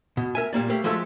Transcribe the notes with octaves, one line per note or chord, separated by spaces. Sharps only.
B2
A#4 E5 G#5
A#2 G3 A#3 D5
A3 A#3 G4
F3 G#3 A3 A4 E5